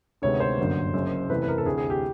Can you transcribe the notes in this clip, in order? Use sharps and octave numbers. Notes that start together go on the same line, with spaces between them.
D2 C3 D#3 G#3 B3 C#5
C5
G1 F#2 D3 F#3 A#3
F#1 F#2 C#3
E2 C3 E3 A3 B4
B4
A#4
A4
D2 C3 E3 G#4
G#4
G4